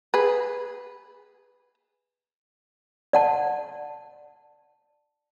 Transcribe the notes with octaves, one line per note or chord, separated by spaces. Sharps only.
G#4 B4
D5 F#5 A5